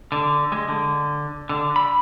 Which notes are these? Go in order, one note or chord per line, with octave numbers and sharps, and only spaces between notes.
D3
G#3
D3
D3
B5